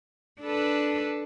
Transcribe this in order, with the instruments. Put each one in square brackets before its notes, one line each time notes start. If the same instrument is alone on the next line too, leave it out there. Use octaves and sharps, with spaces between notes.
[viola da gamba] D4 A4 B4